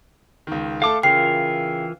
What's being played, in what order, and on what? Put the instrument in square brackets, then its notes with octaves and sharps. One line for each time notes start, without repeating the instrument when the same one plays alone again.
[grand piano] C#2 D#3
[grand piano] A3 A4 [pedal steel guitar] F5 D6
[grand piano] C#3 [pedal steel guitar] E3 F4 A#4 [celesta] G5 C7